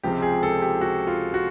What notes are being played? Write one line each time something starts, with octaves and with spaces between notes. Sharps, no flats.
C#2 C3 F3 G#3 C4 G4
G#4
A4
G4
F#4
F4
F#4